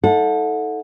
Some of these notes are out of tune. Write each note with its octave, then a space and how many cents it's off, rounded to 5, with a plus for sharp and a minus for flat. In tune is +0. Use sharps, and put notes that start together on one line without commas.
D#4 +40 A4 +0 F#5 -30